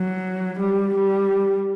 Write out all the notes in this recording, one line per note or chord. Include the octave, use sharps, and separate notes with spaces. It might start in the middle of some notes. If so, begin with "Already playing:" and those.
Already playing: F#3
G3
G3